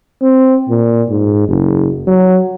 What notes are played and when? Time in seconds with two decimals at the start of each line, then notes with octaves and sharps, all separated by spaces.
0.21 C4
0.69 A#2
1.10 G#2
1.48 F#1
2.07 F#3